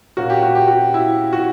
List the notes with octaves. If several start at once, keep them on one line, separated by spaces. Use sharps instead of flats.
A#2 A#3 C#4 F#4
G4
F#4
G4
F#4
E4
F#4